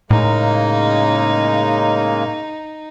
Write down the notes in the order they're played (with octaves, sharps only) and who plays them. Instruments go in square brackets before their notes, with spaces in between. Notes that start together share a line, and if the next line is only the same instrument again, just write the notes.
[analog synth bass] A2 [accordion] C#3 G#3 A#3 [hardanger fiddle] D#4